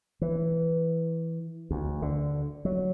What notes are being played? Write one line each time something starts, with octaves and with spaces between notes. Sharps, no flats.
E3
D2
D3
F#3